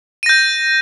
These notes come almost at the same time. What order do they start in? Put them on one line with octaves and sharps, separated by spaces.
D#7 A#6 G6